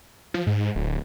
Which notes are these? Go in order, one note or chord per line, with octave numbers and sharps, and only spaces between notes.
F3
G#2
D1